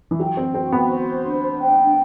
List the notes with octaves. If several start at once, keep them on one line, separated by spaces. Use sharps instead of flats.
E3
F#3 G5
C4
C4 F#4
B3
C5
D4
G5